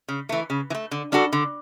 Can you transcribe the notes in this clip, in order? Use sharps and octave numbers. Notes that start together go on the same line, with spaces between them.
C#3
E3 A3
C#3
E3
A3
D3
G3 D4 F#4 A4
D3